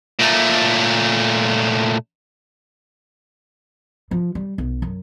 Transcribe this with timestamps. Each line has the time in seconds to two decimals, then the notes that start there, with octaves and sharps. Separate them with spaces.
0.19 A#2 A3
4.11 F3
4.35 G3
4.58 B1
4.82 F#2